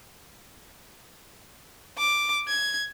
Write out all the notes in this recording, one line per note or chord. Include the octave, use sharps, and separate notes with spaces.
D6
G#6